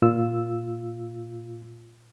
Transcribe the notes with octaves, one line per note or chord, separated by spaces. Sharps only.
A#2 F4 E6